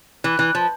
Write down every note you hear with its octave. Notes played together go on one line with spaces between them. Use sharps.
E3
E3
F3